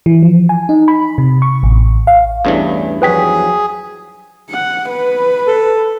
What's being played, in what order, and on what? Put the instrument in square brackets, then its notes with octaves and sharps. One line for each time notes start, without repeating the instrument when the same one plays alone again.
[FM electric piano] E3
F3
G#5
D#4
B5
C3
C#6
A1
F5
[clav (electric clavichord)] E2 G2 E3 [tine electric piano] A3 C#4 D4
[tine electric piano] F3 F#3 F#4 [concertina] G#4 [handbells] B4 G5 B6
[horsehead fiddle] F#5
B4
[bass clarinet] A4